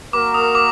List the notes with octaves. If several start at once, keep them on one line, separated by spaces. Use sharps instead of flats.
A#3 F#4 A#4 D6
D#6
D6